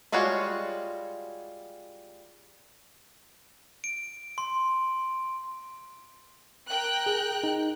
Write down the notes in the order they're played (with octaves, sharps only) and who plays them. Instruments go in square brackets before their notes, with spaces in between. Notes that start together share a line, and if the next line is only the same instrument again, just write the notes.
[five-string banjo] G3 G#3 F4 F#4 C#5
[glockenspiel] D7
C6
[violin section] A#4 G5 F#6
[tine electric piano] G#4
D#4